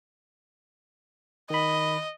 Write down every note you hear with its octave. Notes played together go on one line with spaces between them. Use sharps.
D#3 D#5 B5